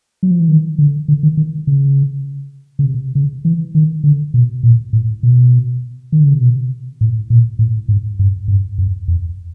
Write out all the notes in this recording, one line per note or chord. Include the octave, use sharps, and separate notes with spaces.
F#3
F3
E3
D#3
D3
D3
D#3
D#3
C#3
C#3
C3
C#3
E3
D#3
D3
B2
A#2
A2
B2
D#3
D3
C#3
C3
B2
A2
A#2
A2
G#2
G2
G2
F#2
F2